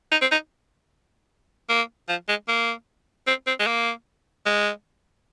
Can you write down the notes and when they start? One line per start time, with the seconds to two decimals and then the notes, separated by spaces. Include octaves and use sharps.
0.12 D#4
0.21 C4
0.32 D#4
1.69 A#3
2.09 F3
2.29 G#3
2.48 A#3
3.27 C4
3.47 C4
3.60 G#3
3.67 A#3
4.46 G#3